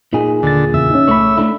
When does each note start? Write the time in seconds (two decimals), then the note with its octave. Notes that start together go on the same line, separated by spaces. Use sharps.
0.13 A#2 D#4 G#4
0.43 D#2 D3 A6
0.74 E2 C#3 E5
0.90 C#4 D#4
1.08 C2 A3 C#5 B5
1.37 A3 D4 E4